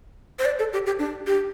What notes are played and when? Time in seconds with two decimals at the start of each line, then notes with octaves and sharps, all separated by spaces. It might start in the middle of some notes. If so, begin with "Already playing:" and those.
0.39 C5
0.45 D5
0.59 A4
0.73 G4
0.86 G4
0.99 D4
1.27 G4